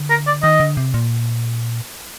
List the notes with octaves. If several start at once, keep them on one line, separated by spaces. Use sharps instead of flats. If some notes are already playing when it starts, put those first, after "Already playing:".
Already playing: D3
A#4
D5
D#3 D#5
D3
C3
A#2